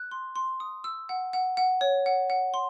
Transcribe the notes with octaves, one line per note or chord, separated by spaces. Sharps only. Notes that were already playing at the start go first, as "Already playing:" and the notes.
Already playing: F#6
C6
C6
D#6
E6
F#5
F#5
F#5
C#5
F#5
F#5
C6